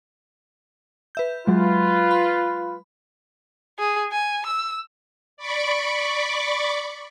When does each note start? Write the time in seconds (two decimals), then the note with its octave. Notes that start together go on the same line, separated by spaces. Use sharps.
1.15 B4 E5 G6
1.47 F#3 G#3 F4 B4
2.11 B5
3.79 G#4
4.12 G#5
4.47 E6
5.37 D5 B5 C#6 D6